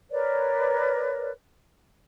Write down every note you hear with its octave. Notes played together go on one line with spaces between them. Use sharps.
A#4 B4 C#5 D5